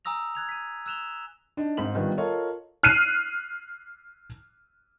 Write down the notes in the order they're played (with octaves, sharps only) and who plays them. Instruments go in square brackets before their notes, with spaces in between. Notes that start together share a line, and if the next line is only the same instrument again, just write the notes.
[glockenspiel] G#5 A#5 D#6 E6 A#6 F7
F#6 G#6 F7
B6 D#7
E6 F#6 E7 F7 G7
[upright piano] D4 D#4
G#1 G#2 F#7
G2 D#3 F3 B3
F4 A4 A#4 C#5 D#5 F5
[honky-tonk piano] F6 F#6 C7 D#7